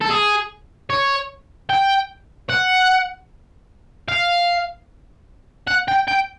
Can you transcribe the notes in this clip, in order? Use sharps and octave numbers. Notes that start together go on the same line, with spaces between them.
A4
G#4
C#5
G5
F#5
F5
F#5
G5
G5